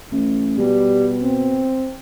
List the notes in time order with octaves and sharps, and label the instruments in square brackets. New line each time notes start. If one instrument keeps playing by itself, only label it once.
[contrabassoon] A1
[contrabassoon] B2 [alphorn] G3
[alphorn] C4